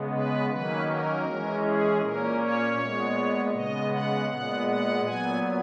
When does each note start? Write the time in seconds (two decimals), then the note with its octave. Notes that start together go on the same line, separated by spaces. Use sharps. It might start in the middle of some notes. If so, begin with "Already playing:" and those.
Already playing: C#3 G#3 B3
0.12 B4
0.50 D#3 F#3 A#3 C#4 B4
0.87 A#4
1.26 E3 G#3 C#4
1.64 G#4
2.01 A#2 A#3 C#4 A#4
2.39 C#5
2.78 A#2 G#3 B3
3.54 C#3 G#3 B3 D#5
3.92 F#5
4.30 A#2 G#3 B3 F#5
4.67 F#5
5.05 A#2 F#3 B3 G#5